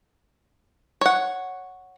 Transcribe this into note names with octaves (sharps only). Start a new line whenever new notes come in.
C#5 F#5